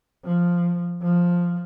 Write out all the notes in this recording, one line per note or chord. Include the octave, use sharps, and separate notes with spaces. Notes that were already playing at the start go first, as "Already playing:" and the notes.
F3
F3